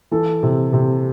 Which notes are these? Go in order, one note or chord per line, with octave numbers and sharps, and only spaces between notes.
E3 A4
C3
C3